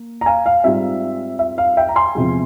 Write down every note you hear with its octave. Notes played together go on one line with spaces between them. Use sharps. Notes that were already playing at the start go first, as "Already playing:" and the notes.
Already playing: A#3
A#5
F5 G#5
F5
G#2 G3 C4 F4 E5
E5
F5
E5 G5
A#5
G#5 C6
E2 C3 F3 G#3